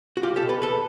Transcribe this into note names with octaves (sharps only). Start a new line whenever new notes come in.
F#4
C2 F4 G4
G4 A4
B2
A4 B4
D#2 A4 B4